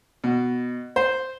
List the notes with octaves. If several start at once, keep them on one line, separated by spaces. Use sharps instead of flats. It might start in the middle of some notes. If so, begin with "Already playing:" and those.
B2
C5